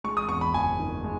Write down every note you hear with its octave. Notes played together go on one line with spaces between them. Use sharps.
G#3 C#6
D#6
E2 C#6
B5
F#1 G#5
D#3
G#3